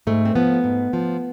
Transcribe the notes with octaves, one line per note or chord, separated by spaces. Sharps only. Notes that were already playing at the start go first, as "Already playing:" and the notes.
G#2 A3
C4
F3 B3
G#2
F3